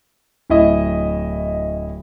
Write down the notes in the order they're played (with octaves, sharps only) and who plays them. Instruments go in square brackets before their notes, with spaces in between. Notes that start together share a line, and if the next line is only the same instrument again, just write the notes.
[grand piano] D1 E4 D#5